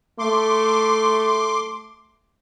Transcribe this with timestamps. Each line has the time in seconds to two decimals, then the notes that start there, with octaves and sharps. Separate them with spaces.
0.19 A3 C6 D6